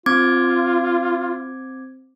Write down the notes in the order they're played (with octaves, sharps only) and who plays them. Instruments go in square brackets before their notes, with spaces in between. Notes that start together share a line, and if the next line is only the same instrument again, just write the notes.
[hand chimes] C4 D6 G#6 [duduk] F4